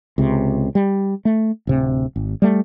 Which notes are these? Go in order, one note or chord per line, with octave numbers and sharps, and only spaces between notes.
C#2 C3
G3
A3
D1 C3
G#1
G3 A3